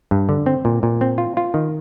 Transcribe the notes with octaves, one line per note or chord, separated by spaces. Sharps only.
G2
D3
C4
A#2
A#2
C4
F4
F4
D#3